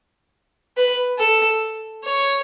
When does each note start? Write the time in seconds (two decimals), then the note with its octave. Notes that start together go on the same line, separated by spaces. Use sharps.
0.77 B4
1.19 A4
2.05 C#5